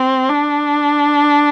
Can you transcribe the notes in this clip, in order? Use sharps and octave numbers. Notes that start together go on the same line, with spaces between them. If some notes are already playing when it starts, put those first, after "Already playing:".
Already playing: C4
D4